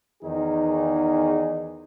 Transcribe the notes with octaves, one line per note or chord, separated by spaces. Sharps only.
E2 D#3 D#4 G#4